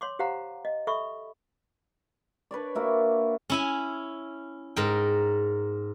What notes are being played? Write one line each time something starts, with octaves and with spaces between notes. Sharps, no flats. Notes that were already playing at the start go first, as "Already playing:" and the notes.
C#5 C6 D6
G4 C5 F5 F#5 A#5
D#5
A4 E5 B5 C#6
D4 B4 C#5 D5
A#3 E4 F#4
C#4 E4 G#5
G#2 A#4 G5